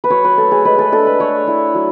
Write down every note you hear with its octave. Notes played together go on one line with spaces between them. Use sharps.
B4
F#3 C#5
B4
A3 A4
G#4
G#3 B4
A4
D4 A4
B4
A3 C#5
E4
F#3